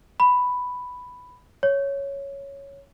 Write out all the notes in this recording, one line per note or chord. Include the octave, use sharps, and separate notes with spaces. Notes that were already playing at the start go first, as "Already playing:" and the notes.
B5
C#5